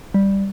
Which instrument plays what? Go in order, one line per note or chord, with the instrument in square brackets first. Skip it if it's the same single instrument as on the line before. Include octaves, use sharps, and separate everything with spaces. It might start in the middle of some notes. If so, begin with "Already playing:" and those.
[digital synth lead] G3